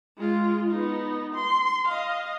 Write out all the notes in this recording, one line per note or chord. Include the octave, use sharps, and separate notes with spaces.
G#3 F4
B3 D#4
C6
D#5 F5